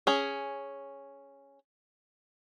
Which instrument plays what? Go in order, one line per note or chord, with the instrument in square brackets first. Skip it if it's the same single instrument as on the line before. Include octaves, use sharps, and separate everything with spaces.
[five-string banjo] C#4 G#4